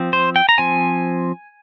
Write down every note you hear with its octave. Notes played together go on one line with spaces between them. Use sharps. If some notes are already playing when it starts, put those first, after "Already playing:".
Already playing: F3 C4
C5
G5
A#5
F3 C4 G#5